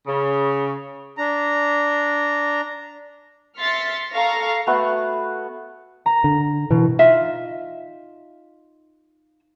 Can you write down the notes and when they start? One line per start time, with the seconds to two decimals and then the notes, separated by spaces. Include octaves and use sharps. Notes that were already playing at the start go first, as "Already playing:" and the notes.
0.07 C#3
1.17 D4 A#5
3.59 E5 C6 F6 A6 B6 C#7
4.13 A4 F5 A#5 C#6 A#6
4.67 A3 B3 F#4
6.06 A#5
6.24 D3
6.71 B2 E3
6.99 D#4 F4 E5